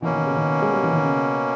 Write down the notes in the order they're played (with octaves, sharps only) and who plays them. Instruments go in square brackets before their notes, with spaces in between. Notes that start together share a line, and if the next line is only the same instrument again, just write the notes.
[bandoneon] B2 A#3 C#4 [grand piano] E3
[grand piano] D#3
C#3
D#3
G#3
G3
E3
D#3
C#3